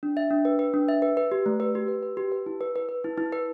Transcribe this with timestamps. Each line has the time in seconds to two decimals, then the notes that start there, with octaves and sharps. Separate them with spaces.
0.03 D4
0.17 E5
0.30 D4
0.45 B4
0.59 B4
0.74 D4
0.89 E5
1.02 B4
1.17 B4
1.32 G4
1.46 A3
1.60 B4
1.75 G4
1.88 B4
2.03 B4
2.17 G4
2.32 B4
2.46 E4
2.61 B4
2.76 B4
2.89 B4
3.04 E4
3.17 E4
3.32 B4